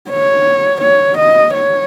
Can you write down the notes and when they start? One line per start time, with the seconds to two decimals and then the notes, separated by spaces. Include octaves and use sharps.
0.11 C#5
0.82 C#5
1.18 D#5
1.55 C#5